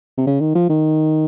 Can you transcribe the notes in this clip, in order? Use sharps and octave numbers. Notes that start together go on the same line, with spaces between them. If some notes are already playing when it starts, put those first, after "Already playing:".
C3
C#3
D#3
F3
D#3